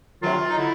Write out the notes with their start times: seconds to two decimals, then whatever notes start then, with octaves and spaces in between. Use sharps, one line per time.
0.21 D2 C3 D#3 F#3 F4
0.49 D#4
0.56 D3 E4